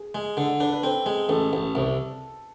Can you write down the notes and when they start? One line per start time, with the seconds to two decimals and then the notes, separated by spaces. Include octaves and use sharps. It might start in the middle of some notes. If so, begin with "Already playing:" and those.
Already playing: G#4
0.15 G#3
0.37 D3 A4
0.60 D4 B4
0.71 B4
0.84 C4 A4
1.06 G#3 G#4
1.29 A1 A4
1.53 A1
1.75 C2